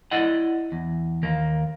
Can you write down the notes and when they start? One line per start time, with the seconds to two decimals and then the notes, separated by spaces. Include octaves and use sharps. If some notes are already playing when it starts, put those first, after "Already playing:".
0.11 E4 D5 D#5 F#5
0.72 E2
1.23 D#2 A#3